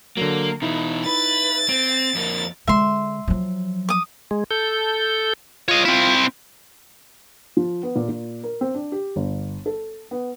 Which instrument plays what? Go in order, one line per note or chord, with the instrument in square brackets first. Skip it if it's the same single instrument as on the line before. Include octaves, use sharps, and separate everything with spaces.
[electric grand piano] D3 F#3 [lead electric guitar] A#3
[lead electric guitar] B2 E3 [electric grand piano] D#4 E4
[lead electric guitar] B4 [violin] A6
[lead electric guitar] C4 [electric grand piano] D7
[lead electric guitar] F2 A#3
[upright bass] D3 G#3 [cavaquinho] E5 C6
[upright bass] F3 F#3
[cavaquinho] D6 D#6
[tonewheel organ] G#3
A4 G6
[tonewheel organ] F4 [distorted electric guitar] C#5 D#5
[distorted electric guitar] C4 E4
[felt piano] F3
B3
A#2
A#2
A#4
C4
D4
G4
G1
A4
B3